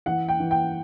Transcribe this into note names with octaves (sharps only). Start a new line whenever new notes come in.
E3 F#5
G5
E3
G5